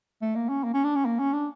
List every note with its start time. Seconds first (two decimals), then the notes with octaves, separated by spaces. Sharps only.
0.22 A3
0.36 A#3
0.49 C#4
0.64 A#3
0.74 C#4
0.84 D4
0.96 C#4
1.05 A#3
1.19 C#4
1.33 D4